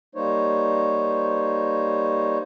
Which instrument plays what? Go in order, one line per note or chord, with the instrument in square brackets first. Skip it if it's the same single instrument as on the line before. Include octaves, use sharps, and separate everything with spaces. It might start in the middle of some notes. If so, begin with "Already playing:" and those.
[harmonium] G3 A#3 D#4 C5 C#5